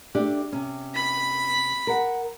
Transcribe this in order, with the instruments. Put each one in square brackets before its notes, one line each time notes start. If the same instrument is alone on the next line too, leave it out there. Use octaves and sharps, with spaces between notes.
[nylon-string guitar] A3 D4 G4
C3 C#4
[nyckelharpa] B5
[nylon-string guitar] A#4 F#5